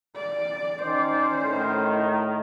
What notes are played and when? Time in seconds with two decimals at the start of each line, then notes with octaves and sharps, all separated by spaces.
0.16 D5
0.82 D#3 C#4 C5 D5
1.40 A2 D#3